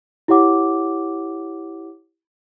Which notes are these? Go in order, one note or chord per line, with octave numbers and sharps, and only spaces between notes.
E4 G4 C#5 F#5 D6